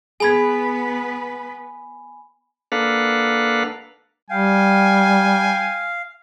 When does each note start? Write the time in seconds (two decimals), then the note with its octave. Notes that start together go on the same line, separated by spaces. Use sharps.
0.20 B3 G#4 B4 G#5 B5 G#6
2.72 A#3 D4 A4 B4 F5 F#5
4.30 G3 F5 G5 G#5